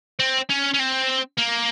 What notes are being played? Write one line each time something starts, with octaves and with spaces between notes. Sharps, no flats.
C4
C#4
C#4
C4
A#3